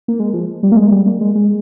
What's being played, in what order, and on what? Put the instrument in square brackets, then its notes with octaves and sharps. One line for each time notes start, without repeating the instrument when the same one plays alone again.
[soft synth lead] A#3
G#3
F3
G3
A#3
G#3
G3
A#3
G#3
G#3